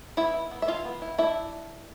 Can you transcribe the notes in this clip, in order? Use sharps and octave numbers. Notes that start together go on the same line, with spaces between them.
B3 E4 E5
E4
B3
E5
E3 F4 F5
B3
E4
D4 E4 E5